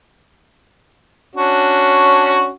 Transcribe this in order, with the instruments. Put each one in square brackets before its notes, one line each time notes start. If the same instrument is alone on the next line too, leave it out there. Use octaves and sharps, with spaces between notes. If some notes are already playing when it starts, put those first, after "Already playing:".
[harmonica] C#4 D4 F#4